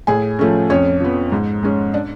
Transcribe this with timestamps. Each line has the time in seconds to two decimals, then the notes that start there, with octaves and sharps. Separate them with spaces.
0.07 A2 G#4 G#5
0.39 F3 A3 C#4
0.70 F2 C#4 C#5
1.00 F3 B3
1.32 G#2
1.63 G#3 C#4
1.94 D4 D5